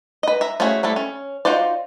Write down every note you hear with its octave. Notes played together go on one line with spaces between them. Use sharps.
B4 D#5
E5 A#5
A3 C#4 E4 F#4 G#4
G3 A3 E4 A4
C#4
D#4 F4 F#4 C5 D5